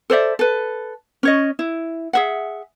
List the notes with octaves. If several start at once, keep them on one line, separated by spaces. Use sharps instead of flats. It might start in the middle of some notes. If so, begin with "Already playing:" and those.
A4 C5 D5 E5
A4 B4
C#4 C#5 D#5
E4
G#4 E5 F#5